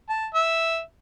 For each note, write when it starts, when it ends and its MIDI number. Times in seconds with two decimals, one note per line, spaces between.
0.09 0.26 81
0.34 0.79 76